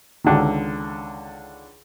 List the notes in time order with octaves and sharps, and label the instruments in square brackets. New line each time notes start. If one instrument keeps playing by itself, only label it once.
[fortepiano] C#2 D3 D#3